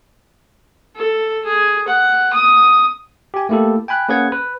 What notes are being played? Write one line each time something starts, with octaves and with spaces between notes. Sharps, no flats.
A4
G#4
F#5
D#6
G4 G#5
A3 A#3 E4 G4 A4
G5 G#5 B5 F#6
A#3 C#4 G#4 B4 F#5 G#6
B4